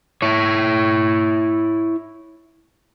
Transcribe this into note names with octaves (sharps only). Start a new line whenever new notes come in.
E4 C#5